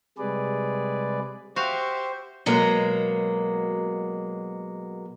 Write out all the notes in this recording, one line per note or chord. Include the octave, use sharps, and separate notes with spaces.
C3 G3 G#3 G#4 B4 D5
F#4 G4 C5 E5 F5
B2 F#3 G#3 A#3